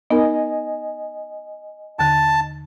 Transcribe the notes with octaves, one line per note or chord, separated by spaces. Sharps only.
B3 D#4 A#4 D#5 G#5
D#2 D3 A5